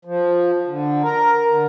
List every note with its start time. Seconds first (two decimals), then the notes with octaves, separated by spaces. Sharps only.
0.05 F3
0.67 D3
1.03 A#4
1.47 D3